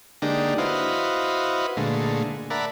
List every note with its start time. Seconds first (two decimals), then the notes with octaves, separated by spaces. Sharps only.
0.22 D3 G#3 A#3 D4 D#4 G4
0.58 E4 F#4 B4 C5 D#5 F5
1.77 A#2 D3 G#3 A3
2.50 A#4 D5 E5 F#5 A5 B5